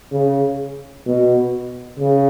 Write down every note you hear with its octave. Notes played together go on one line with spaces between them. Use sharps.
C#3
B2
C#3